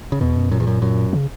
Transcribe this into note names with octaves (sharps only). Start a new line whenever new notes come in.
C#3
E2 B2
F#2
F#2 A#2
E2
F#2
F#2
C#3